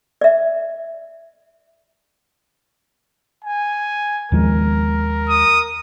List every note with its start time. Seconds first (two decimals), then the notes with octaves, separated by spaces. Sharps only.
0.21 D5 E5
3.44 G#5
4.32 D#2 F3 G#3 A#4
5.29 D#6